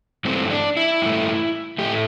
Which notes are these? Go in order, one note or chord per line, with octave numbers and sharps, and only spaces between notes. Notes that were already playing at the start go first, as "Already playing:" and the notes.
G2 E3 A3 C4
D4
E4
G2 E3 A3
A2 A3 G4